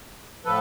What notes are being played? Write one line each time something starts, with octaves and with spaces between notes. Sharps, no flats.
A2 F3 A4 B4